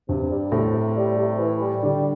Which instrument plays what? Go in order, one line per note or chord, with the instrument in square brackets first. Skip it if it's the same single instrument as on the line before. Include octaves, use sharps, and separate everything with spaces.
[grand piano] G2 [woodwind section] C3
[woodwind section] G3
[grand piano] A2 [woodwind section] C3
[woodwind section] C3
G3
C3
E3
G3
[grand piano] D3 [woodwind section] G3